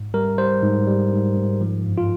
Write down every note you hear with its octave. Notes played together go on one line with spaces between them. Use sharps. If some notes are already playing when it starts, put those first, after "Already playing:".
Already playing: G#2
G3 A#4
G3 C5
G#2
G3
G#2
G#2
F3
G2
F4